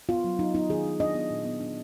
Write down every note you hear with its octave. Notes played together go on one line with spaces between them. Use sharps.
B3 F4
F#3
F#3 D#4
B3 D#4
D#3 G#4
D4
D4 D#5
B3
A#2
B3
D4